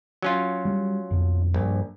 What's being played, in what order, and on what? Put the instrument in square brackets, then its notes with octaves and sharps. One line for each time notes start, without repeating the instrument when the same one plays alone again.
[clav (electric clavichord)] F#3 C#4 F4
[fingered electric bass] G3
B1 F2
[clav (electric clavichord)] A#1 [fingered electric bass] G2